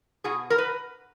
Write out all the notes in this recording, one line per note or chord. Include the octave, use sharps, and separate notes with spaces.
B2 F#4 G#4
A#4
B4